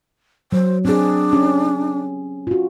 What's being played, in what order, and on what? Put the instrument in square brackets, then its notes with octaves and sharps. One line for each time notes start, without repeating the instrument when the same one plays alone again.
[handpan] F#3 [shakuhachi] C5
[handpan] C4 G#4 [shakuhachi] D4
[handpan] C#4 G4
F4 F#4